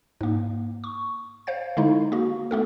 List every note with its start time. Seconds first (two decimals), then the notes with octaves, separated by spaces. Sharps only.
0.21 G#2 A#3
0.84 C#6
1.47 C5 F5 G6
1.77 D3 G#3 D#4 E4
2.12 A#3 F#4
2.51 A3 B3 A4